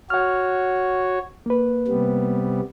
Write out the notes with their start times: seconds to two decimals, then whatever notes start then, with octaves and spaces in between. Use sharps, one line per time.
0.10 F#4 C#5 F#5 F6
1.46 A#3 B4
1.88 C3 G3 B3